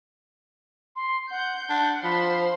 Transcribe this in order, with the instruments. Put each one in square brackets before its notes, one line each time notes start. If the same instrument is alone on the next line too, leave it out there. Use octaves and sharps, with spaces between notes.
[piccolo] C6
[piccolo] F#5 [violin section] G6
[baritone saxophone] D4 [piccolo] F#5
[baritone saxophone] F3 [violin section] C5 C6 [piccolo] B5